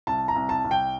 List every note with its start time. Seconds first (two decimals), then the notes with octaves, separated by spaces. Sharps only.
0.07 C2 A5
0.28 A#5
0.36 C2
0.49 A5
0.65 C2
0.71 G5